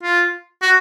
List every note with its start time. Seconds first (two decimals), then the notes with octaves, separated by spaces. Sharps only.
0.03 F4
0.62 F#4